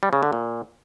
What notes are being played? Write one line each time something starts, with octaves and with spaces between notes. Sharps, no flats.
G3
C#3
D3
A#2